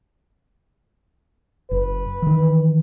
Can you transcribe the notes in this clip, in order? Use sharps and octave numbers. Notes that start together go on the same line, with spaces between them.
F#1 B4
D#3 E3